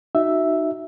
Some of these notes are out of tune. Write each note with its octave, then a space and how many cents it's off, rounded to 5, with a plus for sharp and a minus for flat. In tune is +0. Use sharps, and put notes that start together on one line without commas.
D#4 -15 F#4 +0 E5 +0